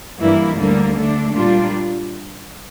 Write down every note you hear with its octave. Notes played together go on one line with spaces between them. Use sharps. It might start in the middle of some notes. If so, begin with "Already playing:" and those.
G2 E3 A#3 E4
D2 D3 G3 A#3
D3 A3 D4
A#2 G3 A#3 D4 F4